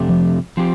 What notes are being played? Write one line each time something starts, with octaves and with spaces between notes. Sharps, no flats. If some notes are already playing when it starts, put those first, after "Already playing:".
Already playing: F2 C3 A3 D4 G4
F3
F3 C4 G4